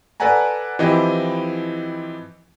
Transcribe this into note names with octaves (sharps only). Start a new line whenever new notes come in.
A4 B4 D5 F#5 G#5 A#5
E3 F3 C4 E4 G4 D#5